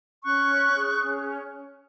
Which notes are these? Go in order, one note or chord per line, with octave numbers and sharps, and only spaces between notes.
C#4 C#6 F#6
C#5
G#4
C#4